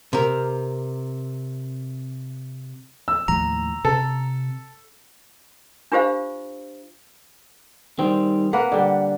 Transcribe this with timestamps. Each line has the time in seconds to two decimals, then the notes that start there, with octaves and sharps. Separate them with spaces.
0.13 C3 A#4
3.08 E6
3.28 D#2 A2 F3 A#5
3.85 C3 A4
5.92 D4 F4 G4 C5 F5
7.99 D#3 G3 C4
8.53 A#3 B4 F#5
8.72 D3 G3